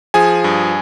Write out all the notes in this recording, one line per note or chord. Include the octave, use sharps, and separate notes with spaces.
F3 G#4 G#5
G2